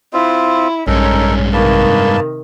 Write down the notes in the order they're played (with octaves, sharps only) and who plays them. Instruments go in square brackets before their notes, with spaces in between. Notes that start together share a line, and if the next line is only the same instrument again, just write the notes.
[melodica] C4 F4 [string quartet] E4
[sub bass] A#1 [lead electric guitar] G2 G#3 [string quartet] C#4 [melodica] D#4 A4 A#4
[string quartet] C3 D#3 [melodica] A#3 B4 A5